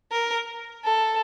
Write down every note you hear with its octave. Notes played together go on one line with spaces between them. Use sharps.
A#4
A4